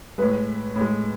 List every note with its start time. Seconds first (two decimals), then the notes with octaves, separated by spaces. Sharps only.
0.18 A2 G#3 B4
0.76 A2 G#3